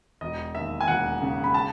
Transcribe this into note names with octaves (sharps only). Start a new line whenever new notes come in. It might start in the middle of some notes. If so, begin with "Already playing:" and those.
E1 D#5
D#2 E5
G#5
E1 F#5
C#3
B5
A5